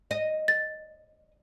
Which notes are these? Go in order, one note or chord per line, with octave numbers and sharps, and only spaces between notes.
D#5
A6